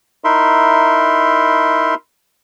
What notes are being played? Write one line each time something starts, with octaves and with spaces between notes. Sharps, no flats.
D#4 E4 A#4 E5 C6